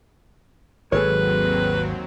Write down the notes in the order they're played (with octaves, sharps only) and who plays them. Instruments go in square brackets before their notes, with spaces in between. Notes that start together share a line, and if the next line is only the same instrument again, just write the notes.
[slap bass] G#1 [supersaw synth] D#2 F#3 C4 [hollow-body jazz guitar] G#4 A4 C#5 [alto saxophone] B4